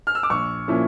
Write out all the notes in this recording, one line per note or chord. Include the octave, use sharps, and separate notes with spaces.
F6
E6
D6
A#1 C#6
A#2 F3 C#4 E4